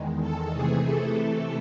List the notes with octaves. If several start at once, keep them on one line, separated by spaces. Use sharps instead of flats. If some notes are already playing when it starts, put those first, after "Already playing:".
Already playing: E2 D#3 G#3
A4
C3 E3 A3 G#4
A4
A4